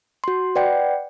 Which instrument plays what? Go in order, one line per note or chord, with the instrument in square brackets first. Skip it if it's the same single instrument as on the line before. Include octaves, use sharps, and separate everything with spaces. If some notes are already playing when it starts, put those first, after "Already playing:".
[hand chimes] F#4 C6
B4 D5 F#5 G5